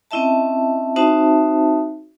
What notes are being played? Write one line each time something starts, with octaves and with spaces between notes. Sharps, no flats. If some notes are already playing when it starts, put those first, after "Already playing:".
C4 C#4 E4 D#5 E5 A5
C4 D#4 F#4 C5 E5 A5